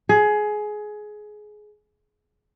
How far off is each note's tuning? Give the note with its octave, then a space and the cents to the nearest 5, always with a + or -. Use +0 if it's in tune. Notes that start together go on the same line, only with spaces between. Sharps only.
G#4 +20